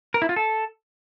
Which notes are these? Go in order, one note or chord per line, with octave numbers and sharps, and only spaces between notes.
A#4
E4
F4
A4